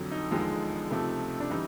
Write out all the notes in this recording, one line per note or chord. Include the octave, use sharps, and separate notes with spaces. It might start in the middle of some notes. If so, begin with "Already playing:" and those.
Already playing: F2 D3 F#3
D#4
E1 D#2 D3 F3 G#3 D#4
C#2 C3 F3 A3
D4
C#3 E3 G3 D#4